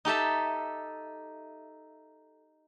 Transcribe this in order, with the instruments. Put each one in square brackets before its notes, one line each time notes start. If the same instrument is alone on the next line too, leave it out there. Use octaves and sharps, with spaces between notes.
[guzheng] D#4 G4 A4 E5